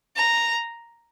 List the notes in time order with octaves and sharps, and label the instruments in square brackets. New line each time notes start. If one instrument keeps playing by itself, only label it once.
[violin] A#5